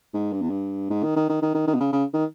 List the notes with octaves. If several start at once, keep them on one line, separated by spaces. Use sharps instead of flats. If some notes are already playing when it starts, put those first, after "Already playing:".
G#2
G2
E2
G2
G#2
D#3
D#3
D#3
D#3
D#3
D#3
B2
C#3
C#3
D#3